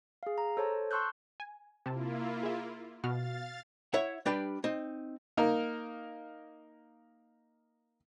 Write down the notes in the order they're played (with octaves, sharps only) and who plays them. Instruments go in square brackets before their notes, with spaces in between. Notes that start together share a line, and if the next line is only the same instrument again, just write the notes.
[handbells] G#4 F5
A#5
A4 C5 C#5 A5
A5 C6 C#6 E6 F#6 G6
[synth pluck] G#5
[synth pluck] C3 A5 [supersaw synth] A#3 E4 F4
[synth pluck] G#4 E5
[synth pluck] B2 F#4 F6 [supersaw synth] F5 A6
[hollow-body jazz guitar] E4 C#5 E5 F#5
G3 D4 G4 B4 D5 G5
C4 D#4
[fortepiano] A#3 D#4 A#4